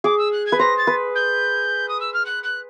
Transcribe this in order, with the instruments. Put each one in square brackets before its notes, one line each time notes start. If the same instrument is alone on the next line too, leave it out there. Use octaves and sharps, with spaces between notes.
[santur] G#4 [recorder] D6
[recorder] E6
F#6
G#6
[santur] B4
[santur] C5 [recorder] A#6
[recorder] A6
[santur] B4
[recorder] G6
D#6
E6
F6
F#6
F#6